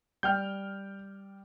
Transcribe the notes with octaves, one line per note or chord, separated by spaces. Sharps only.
G3 G5 F6 G6